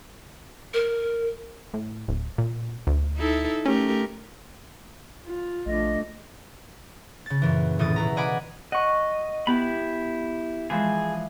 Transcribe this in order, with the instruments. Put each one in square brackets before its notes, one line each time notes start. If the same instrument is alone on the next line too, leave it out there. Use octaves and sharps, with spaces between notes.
[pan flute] A#4
[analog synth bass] A2
D1
A#2
D2
[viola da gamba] D#4 E4 A4
[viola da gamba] A3 G4 A#4 [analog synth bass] C#4
[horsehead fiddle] F4
[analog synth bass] A#1 [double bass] A3 D4 [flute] D#5
[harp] C#3 A6
F#2 A#2 E3
D#1 A2 E3 D#6 A6
B2 E4 A#5
D5 D#5 F#5 G#5 B5 D6
[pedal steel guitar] D#5 [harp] F#5 C#6
[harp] B3 [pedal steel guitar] E4 G4 B5
[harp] E3 F3 G#3 [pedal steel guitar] G#4